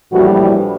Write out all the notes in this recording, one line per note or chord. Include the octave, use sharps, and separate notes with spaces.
A#1 A2 E3 G3 F#4